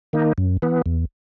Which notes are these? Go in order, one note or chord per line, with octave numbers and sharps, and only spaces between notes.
D#3 A#3 D#4
F#2
E3 B3
E2